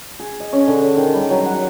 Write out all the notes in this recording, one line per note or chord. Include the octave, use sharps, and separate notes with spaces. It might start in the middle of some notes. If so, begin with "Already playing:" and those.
G#4
D#5
C#4
D3
D#3
G3
F#3
F#5